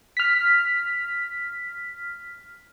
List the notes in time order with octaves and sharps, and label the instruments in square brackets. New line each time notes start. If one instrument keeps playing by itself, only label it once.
[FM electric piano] F6 B6